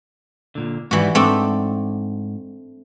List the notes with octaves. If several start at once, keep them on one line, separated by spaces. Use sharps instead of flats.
A#2 D3
G#2 E3 G3 F#4
G#2 A3 C4 D4